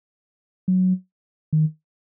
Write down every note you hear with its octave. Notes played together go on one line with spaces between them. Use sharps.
F#3
D#3